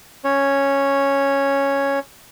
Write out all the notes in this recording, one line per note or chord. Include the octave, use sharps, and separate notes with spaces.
C#4 C#5